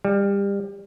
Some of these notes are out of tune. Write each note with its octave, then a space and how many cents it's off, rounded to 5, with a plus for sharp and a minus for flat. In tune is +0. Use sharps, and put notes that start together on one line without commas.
G3 +25